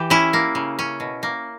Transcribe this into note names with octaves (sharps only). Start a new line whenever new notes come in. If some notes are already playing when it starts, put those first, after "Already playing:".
Already playing: E3 G4
C#4 E4
A#3
C#3
C#4
B2
A#3